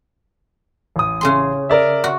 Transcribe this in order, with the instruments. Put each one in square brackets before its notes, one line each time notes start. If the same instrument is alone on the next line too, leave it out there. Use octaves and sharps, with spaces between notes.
[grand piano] A1 D#6
[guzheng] C#3 G#4 C6
[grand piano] A#4 D5 E5
[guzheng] F#4